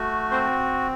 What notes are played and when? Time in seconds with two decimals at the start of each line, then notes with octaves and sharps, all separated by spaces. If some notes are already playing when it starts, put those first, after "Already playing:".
Already playing: A3 F#4
0.31 C4 C5